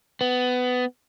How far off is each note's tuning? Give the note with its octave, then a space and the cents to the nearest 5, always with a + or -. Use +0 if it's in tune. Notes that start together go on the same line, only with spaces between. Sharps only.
B3 +20